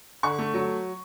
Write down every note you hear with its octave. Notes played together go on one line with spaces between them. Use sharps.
D3 C#6
A3
F#3